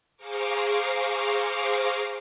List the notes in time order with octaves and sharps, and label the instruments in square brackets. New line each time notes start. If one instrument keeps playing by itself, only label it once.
[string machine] G#4 C5 F5 A#5 C#6 D6